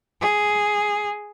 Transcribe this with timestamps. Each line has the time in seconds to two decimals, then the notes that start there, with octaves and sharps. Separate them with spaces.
0.21 G#4